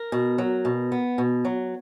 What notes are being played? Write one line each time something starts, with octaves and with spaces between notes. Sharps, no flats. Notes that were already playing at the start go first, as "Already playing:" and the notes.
Already playing: A#4
B2
F#3
B2
B3
B2
F#3